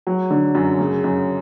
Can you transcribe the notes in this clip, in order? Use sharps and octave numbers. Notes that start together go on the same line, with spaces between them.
F#3
D3
F#2
C#3
F#2